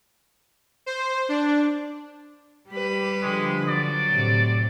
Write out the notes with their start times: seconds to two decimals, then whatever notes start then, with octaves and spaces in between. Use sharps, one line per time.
0.86 C5
1.29 D4
2.70 G3 G4 B4
3.23 D3 F3 G#3
3.68 F#3 D5
4.10 A2 C3